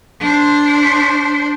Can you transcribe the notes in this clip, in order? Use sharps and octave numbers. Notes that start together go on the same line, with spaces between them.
D4 C5